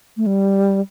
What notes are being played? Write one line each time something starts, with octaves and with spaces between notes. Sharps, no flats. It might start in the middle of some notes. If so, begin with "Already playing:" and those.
A3
G3